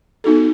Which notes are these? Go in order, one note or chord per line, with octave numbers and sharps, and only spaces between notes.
B3 D#4 F#4 A4